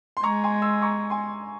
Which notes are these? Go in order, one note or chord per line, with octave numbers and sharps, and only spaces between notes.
C6
G#3 A#5 C#6
G#5 C6
C6 E6
A#5 C#6
G#5 C6